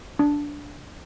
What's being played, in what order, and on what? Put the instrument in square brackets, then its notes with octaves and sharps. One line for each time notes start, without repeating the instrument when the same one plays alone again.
[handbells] D4